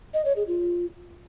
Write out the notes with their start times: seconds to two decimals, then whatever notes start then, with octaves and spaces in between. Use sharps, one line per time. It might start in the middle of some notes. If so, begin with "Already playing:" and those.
0.14 D#5
0.25 C#5
0.36 G#4
0.47 F4